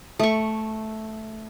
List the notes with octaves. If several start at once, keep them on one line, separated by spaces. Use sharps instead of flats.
A3 C#6